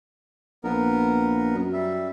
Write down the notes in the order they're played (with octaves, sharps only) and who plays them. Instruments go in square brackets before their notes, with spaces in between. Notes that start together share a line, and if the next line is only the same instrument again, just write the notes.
[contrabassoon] A#1 [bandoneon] B3 A#4
[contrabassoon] F#2
[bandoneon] G3 E5